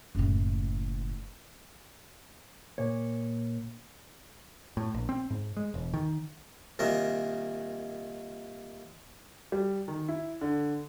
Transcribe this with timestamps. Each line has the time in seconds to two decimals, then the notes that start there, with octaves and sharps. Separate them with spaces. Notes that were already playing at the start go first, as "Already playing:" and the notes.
0.15 F#1 A2
2.78 A#2 C#5
4.77 A2
4.94 A#1
5.09 C4
5.30 G#2
5.57 G#3
5.74 E1
5.94 D#3
6.79 C2 A#2 D#3 A#4
9.52 G3
9.88 D#3
10.08 E4
10.41 D3